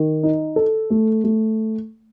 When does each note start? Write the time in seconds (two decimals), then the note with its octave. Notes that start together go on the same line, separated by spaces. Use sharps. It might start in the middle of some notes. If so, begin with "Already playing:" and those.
Already playing: D#3
0.23 D#4
0.56 A4
0.90 A3
1.24 A3